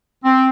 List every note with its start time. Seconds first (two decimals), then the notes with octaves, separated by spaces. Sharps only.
0.24 C4